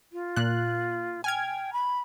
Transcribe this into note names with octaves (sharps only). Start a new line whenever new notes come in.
F4
A#2 F#6
G5 G#5 F6 G#6
B5